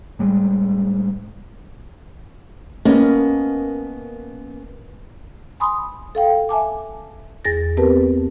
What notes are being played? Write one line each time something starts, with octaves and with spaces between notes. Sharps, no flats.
A2 G3 G#3
A#3 B3 C#4 A#4 D#5 A5
G#5 B5 C6 D#6
A4 F5 G5
E5 G#5 A5 D6
E2 G#4 A6 A#6
B3 C4 G4 A#4 B4 A5